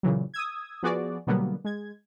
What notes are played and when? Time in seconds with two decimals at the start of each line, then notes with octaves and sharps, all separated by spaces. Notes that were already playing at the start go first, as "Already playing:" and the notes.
0.03 A#2 C#3 E3 F#3
0.34 D#6 E6 G#6
0.83 F3 B3 F#4 G#4 D5
1.27 B2 D3 F#3 G3 A#3 B3
1.65 G#3 G#6